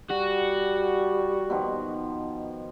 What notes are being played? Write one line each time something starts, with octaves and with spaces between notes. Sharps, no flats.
G3 F#4
B2 D#3 F3